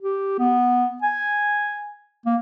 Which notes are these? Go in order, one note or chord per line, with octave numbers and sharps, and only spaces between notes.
G4
B3
G#5
A#3